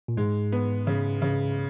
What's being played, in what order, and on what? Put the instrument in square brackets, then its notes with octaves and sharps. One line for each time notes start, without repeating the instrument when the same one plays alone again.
[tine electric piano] A#2
[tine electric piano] G#2 [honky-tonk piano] G#3
[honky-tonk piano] B3
C#3
C#3